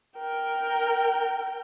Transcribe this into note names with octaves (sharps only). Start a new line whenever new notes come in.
A#4 G5